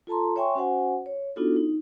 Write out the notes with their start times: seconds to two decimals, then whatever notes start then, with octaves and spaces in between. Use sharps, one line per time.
0.07 F4 A4 A5 A#5 C6
0.36 C#5 E5 G5 G#5 C6 C#6
0.55 C#4 F#4 C5 F#5 G#5
1.06 C#5
1.36 B3 D4 D#4 F4 F#4 A4
1.56 D#4